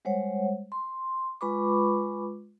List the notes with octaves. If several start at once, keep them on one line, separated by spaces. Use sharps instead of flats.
G3 G#3 C5 C#5 F#5
C6
G#3 F4 B4 B5 C#6 D6